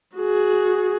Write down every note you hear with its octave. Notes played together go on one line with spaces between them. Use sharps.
F#4 G#4